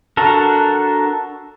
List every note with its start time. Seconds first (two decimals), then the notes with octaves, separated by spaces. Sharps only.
0.17 D4 F#4 A4 A#4